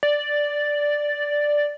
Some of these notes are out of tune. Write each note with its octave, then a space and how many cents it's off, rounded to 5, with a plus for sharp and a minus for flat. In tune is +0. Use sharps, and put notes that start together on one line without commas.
D5 +0